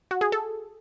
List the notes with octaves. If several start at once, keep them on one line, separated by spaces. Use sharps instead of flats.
F#4
G#4
A4